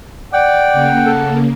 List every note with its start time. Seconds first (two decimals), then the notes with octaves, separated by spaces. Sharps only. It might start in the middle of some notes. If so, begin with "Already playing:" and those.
0.33 D5 F#5 G5
0.73 C#3 A#3
1.05 A4